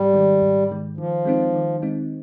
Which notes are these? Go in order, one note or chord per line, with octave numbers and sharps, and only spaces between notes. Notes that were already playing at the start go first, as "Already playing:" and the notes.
Already playing: G#2 G3
D#3 G#3
G#2
D#3 G#3
D#3 F3
G#3 C4 D#4
D#3
G#3 C4 D#4